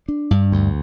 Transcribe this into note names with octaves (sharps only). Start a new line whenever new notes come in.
D4
G2
D2